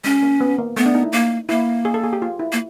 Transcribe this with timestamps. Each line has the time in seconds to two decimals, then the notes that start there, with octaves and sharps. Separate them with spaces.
0.04 G#3 C#4
0.22 A#3
0.41 B3
0.58 A#3
0.77 A3 B3
0.86 D4
0.95 D#4
1.04 E4
1.13 A#3
1.49 A#3 E4
1.85 G#4
1.94 A4
2.04 G#4
2.13 G4
2.22 F4
2.39 E4
2.52 A#3